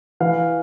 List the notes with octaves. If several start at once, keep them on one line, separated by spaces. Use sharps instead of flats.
E3 F5